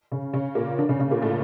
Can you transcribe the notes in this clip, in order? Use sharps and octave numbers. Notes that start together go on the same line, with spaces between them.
C#3 C#4
C#3 C#4
A#2 A#3
D3 D4
C#3 C#4
C#3 C#4
A#2 A#3
A2 A3